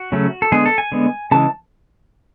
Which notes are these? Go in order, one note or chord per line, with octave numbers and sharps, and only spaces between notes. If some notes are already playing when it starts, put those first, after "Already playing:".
Already playing: F#4
C#3 F#3 A3 C#4
A4
D3 G#3 B3 G#4
A4
G#5
D3 G#3 B3
C#3 E3 G#3 A5